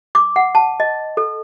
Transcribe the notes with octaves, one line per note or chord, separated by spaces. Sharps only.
D6
F#5
A5
D#5
A4